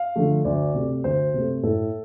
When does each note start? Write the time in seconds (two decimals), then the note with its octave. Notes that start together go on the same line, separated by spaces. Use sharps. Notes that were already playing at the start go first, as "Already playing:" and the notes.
Already playing: F5
0.16 D3 F3 A3
0.45 D2 D5
0.74 C3 A3
1.04 D2 C5
1.34 C3 A3
1.63 A2 A4